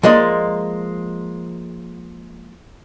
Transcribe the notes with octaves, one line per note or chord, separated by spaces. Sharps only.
F3 G#3 A#3 D5 D#5